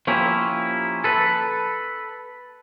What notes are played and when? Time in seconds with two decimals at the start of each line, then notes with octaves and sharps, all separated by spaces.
0.07 F3 A#3 C#4 E4 G4
1.04 A4 B4